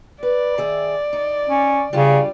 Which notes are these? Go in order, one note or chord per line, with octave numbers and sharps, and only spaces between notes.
B4 D5
D#3 G#4 E5
D#4
C#4
C#3 G3 D4 F4